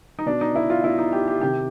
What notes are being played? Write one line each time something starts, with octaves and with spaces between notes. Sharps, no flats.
D#4
B2 D4
D#4
E4
F4
B2 E4
D#4
G4
G4
C3 D#3 G4